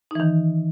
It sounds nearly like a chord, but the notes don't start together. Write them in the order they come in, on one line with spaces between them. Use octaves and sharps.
D#4 E3 D#3